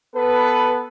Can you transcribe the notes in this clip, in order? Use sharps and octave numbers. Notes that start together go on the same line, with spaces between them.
B3 A4 B4